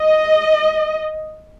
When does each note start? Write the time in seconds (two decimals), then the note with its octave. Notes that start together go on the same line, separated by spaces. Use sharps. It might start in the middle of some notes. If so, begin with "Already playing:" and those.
Already playing: D#5